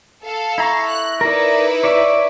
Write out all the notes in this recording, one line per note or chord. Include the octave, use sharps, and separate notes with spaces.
A4 F5
E4 A#5 C#6
F#6
D#4 E4 A#4 B4 D5
C#5 D5 E5